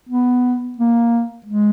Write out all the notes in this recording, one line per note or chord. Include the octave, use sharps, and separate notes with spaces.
B3
A#3
G#3